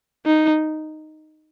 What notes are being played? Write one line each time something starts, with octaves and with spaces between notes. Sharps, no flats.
D#4